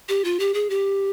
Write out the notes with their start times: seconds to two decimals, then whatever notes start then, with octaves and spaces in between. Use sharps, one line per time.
0.09 G4
0.24 F4
0.40 G4
0.54 G#4
0.70 G4